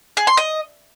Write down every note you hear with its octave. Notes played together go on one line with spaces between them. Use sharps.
G#4
C6
D#5